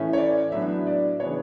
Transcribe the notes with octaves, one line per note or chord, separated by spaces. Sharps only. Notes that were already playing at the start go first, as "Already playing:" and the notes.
Already playing: A2 E3 A3 C#4
C#5
D5
A2 F#3 B3 D4 E5
D5
C#3 E3 B3 D4 C#5